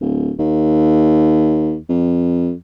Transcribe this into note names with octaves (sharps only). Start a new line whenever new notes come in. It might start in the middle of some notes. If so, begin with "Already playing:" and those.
D1
D#2
F2